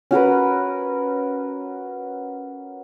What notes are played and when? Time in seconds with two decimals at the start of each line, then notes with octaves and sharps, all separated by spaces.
0.11 C#4 F#4 A#4 B4